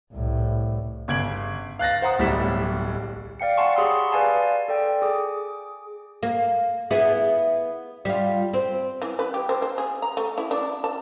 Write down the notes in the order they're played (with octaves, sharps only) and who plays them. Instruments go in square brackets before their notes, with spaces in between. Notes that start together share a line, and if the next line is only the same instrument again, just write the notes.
[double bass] C2 A2
[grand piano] G1 C#3 G#6 D7 F#7
F5 F#6 A6 A#6
C5 F#5 A#5 D#6
D1 B1 A2 G3 B6 E7
[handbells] D5 F5 G5 C#7
F#5 G#5 A5 C6 C#6
G4 G#4 C#5 B5 C6 E6
B4 D5 F5 G#5 A5 C6
A4 D5 G5
G#4 D6
[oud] A#3
B3 E4 G#4
G3 F4
C4
[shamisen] E3
B4
G4
C5
C5
G#4
A#5
A3
E4
D4
A5